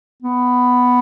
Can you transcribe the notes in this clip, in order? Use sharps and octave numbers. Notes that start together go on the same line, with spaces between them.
B3